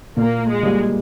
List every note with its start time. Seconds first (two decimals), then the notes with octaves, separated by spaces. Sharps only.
0.17 A#2 A#3
0.48 G#3
0.63 G3 A#3